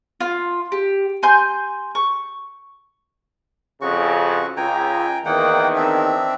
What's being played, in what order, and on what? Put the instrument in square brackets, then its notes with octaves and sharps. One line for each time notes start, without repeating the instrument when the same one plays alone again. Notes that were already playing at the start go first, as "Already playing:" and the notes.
[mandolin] F4
G4
G#5 C6 G6
C#6
[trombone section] F2 C#3 [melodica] F#4 C#6
[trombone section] C#2 [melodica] G5 G#5 A#5
[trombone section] E2 D#3 [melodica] A#3 F#5 G5
[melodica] C4 D4 E5